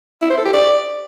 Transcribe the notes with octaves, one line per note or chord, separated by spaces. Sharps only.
E4
C5
A4
G4
D5